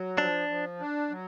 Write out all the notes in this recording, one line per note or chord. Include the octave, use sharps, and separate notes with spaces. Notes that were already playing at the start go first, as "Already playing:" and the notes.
Already playing: F#3
F3 D4
F3
D4
F#3